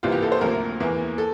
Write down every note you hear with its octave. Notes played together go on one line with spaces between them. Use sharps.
C2 C3 E3 A#3 F4
G4
A4
C5
D2 C3 F3 A#3 A#4
E2 E3 A#3
A4